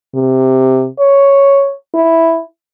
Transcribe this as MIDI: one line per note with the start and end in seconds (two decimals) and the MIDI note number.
0.14 0.87 48
0.99 1.73 73
1.94 2.42 64